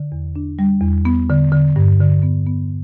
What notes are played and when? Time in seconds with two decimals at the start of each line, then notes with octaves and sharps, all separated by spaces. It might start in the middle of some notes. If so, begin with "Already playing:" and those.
Already playing: D3
0.12 E2
0.36 D4
0.59 G3
0.81 E2
1.05 B3
1.30 D3
1.52 D3
1.76 G2
2.00 D3
2.23 B3
2.47 B3